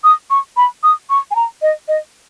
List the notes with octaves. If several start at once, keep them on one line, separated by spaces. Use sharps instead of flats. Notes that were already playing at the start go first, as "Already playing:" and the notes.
D#6
C#6
B5
D#6
C#6
G#5
A#5
D#5
D#5